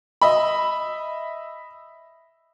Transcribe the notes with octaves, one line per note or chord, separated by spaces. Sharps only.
D#5 E5 B5